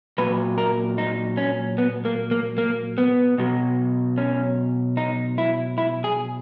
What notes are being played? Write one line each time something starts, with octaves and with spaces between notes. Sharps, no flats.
A#2 F#3 B4
A#4
D#4
C#4
B3
A#3
A#3
A#3
B3
B2 F#3
C#4
D#4
E4
E4
G#4